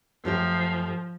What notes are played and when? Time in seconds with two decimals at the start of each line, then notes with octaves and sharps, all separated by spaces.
0.25 F#2 F3 A3 G4